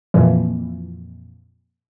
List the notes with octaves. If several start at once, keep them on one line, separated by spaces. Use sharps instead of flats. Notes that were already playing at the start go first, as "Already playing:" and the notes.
F2 A#2 E3